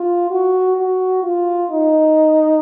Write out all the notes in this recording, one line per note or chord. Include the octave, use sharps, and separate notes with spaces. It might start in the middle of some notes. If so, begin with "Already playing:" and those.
Already playing: F4
F#4
F#4
F4
D#4